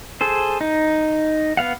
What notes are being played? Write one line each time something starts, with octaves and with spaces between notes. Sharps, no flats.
G#4 A4 C5
D#4
B3 F5 F#5